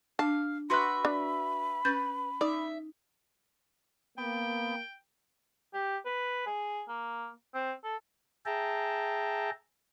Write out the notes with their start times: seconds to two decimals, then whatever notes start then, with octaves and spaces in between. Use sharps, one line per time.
0.19 D4 F5 A5
0.70 F#4 B4 E5 B5 C6 F#6
1.05 D4
1.85 C#4 B4 G6 A6
2.41 D#4 D5 E5
4.18 A#3 B3 G5
5.73 G4
6.06 B4
6.46 G#4
6.88 A#3
7.54 C4
7.84 A4
8.46 G#4 E5 G5 A5 A#5